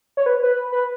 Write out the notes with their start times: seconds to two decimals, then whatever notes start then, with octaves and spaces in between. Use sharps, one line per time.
0.17 C#5
0.26 B4
0.43 B4
0.72 B4